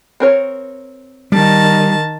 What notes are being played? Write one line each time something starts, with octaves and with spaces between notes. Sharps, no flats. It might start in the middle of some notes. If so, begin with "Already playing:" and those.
C4 A#4 C#5
D#3 G3 A5